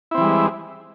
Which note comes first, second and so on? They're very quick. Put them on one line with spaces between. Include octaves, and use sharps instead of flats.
E4 C4 E3 G3 G#3